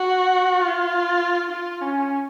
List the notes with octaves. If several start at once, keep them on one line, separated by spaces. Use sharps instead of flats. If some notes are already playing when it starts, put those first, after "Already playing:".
Already playing: F#4
F4
F4
C#4